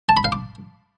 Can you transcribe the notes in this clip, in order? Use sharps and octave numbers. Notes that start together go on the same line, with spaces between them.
A5
B5
F5
D6